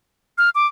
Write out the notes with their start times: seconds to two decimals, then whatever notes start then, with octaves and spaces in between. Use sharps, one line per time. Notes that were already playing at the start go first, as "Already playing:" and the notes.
0.38 F6
0.55 D6